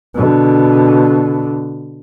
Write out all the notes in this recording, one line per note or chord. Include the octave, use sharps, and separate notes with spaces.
B2 D3